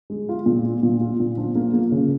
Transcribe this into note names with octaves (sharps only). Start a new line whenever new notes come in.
G#3
F4
A#2
F4
A#2
F4
A#2
F3
A#3
A#3
C#3